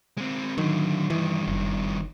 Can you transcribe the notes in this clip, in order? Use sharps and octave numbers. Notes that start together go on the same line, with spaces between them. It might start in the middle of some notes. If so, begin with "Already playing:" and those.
G#3 C4
D3 D#3 F#3
G2 D#3 E3
F#1